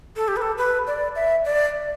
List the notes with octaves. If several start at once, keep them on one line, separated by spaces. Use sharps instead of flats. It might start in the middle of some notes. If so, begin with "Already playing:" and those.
A4
G4
B4
A4
B4
D5
E5
D5